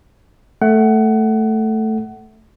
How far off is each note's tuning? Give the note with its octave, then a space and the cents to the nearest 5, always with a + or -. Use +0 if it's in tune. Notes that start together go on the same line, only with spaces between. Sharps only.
A3 +0 F#5 +20